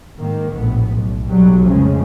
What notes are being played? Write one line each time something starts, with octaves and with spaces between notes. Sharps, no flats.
G#2 D#3 A#3
F1 A#1 A2 B3
B1
B1 F#3 G3
F1 C#3 F3 G#3